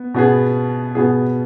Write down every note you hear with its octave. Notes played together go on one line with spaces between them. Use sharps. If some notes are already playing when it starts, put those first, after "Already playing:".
Already playing: B3
B2 B3 G#4
B2 B3 G#4